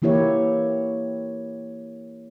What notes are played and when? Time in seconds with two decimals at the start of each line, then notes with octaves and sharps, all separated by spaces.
0.02 E3 A#3 E4 G4 C#5